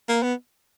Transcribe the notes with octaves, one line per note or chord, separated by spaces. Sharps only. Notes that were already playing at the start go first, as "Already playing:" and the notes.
A#3
B3